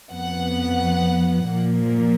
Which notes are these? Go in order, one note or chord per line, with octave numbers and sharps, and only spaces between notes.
F2 F3 B3 F#5
A#2 F3 A#3